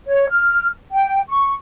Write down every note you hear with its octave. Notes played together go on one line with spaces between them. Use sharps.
C#5
F6
G5
C#6